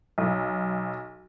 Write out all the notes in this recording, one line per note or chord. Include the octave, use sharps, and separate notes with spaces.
B1